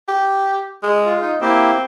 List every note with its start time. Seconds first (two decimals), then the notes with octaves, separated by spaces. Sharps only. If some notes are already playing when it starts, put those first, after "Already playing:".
0.08 G4
0.83 G#3
1.06 F4
1.21 D#4
1.41 A#3 C4 E4 G4